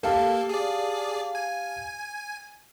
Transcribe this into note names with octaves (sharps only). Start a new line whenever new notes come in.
A#3 G4 A4 F5 A5
G#4 D5
G#5